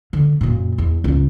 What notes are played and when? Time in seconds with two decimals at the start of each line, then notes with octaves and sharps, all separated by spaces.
0.13 D3
0.41 F#2 A#2
0.78 E2
1.04 C#2 G2